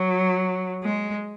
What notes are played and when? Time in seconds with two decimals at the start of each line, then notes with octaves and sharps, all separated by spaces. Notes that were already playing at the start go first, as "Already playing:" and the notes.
Already playing: F#3
0.84 G#3